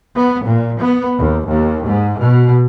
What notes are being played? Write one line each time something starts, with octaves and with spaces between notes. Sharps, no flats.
B3
A#2
B3
D#2
D#2
G#2
B2